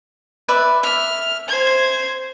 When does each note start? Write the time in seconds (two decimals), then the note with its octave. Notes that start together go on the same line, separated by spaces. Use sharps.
0.49 B4 D5 E5
0.83 E5 F6
1.48 C5 G#6